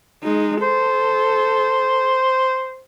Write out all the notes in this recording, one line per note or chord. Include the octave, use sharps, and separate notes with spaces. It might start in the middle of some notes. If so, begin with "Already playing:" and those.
G#3 D#4
A4 C5